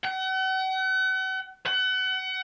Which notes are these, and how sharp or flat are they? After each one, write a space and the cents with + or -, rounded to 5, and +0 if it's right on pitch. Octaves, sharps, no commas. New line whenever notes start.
F#5 +40
F#5 +30